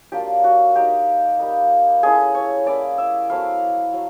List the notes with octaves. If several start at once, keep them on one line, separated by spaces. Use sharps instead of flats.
F#3 A#3 D4 F4 G4
F#4
A#3 D#4 G4
G3 A#3 D#4
A3 C#4 E4 G#4
C#5
A#3 C#4 E4 D5
E5
F#3 A3 C4 E4 F5
F#3